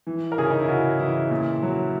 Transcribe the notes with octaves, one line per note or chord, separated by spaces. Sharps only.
E3
A#4
C#3 G#4
D#4
E4
C#3 F#4
E3 E4
A#2
F#3